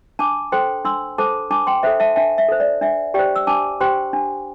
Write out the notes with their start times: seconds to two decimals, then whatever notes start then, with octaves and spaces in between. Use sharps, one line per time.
0.19 D4 A5 D6
0.52 A4 C5 G5 C6
0.85 D4 C6 E6
1.18 A4 C5 A5 D6
1.50 D4 A5 D6
1.67 G5 C6
1.83 A4 C5 E5
2.00 E5 A5
2.16 D4 E5 A5
2.38 E5
2.49 A4 C5
2.60 D5
2.81 D4 E5
3.14 G4 C5 D5 G5
3.36 E6
3.47 D4 A5 D6
3.81 G4 C5 G5 C6
4.13 D4